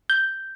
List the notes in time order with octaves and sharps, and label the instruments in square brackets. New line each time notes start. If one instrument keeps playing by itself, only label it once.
[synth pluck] G6